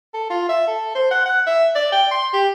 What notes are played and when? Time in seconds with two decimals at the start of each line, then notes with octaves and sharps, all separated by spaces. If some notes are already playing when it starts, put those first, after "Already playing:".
0.14 A4
0.30 F4
0.49 E5
0.67 A4
0.95 C5
1.11 F#5
1.26 F#5
1.47 E5
1.75 D5
1.92 G5
2.11 C6
2.33 G4